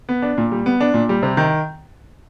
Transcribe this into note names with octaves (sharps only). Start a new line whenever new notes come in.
B3
D4
A#2
G3
B3
D4
A#2
G3
C3
D#3